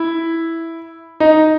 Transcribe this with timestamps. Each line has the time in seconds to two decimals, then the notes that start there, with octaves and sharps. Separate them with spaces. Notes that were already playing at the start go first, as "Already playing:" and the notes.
Already playing: E4
1.20 D#4